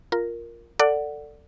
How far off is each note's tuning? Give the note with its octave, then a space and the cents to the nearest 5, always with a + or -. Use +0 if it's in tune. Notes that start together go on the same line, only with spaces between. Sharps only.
F4 +0 A#4 +0
A4 +20 D5 +0 F#5 +0